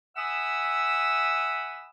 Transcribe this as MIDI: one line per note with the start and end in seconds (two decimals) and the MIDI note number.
0.16 1.90 76
0.16 1.90 78
0.16 1.90 80
0.16 1.90 83
0.16 1.90 87
0.16 1.90 88